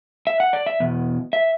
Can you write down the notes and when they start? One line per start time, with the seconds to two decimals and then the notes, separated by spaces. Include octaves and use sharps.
0.27 E5
0.40 F#5
0.53 D5
0.66 E5
0.80 E2 B2
1.33 E5